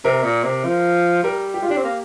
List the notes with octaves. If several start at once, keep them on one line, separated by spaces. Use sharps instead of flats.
C3 A#4
A#2
C3
F3
G3 A#4
G4
F4
D4 G4
C4
A#3